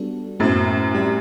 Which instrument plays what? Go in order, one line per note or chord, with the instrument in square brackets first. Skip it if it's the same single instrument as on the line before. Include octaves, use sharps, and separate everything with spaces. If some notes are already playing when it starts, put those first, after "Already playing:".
Already playing: [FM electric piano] G3 B3 D4 F#4 A4
[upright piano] F#2 A2 [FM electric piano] B3 F#4 C5
[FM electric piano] G3 C4 G4 D5